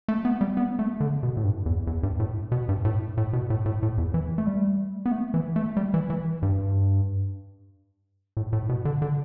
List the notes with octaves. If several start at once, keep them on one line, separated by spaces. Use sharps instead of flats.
A3
B3
G3
B3
A3
D3
B2
A2
G2
E2
E2
G2
A2
B2
G2
A2
A2
B2
A2
A2
A2
E2
E3
A3
G3
B3
A3
E3
A3
G3
E3
E3
G2
A2
A2
B2
D3
D3